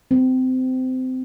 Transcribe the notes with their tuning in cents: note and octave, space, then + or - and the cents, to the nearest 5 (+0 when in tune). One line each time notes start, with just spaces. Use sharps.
C4 -25